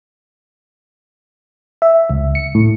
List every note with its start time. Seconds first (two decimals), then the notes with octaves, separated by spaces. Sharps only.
1.82 E5
2.10 C#2
2.35 C#7
2.55 A2